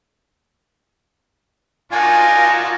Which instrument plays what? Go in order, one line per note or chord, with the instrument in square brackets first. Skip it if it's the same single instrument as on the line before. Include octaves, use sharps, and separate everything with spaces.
[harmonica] D4 D#4 F#4 [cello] F4 A#4 [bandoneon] G#5